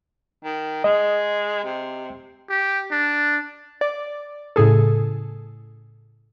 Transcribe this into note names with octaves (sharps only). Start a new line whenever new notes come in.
D#3
G#3 D#5
C3
G4
D4
D5
A2 C#3 G#4 A4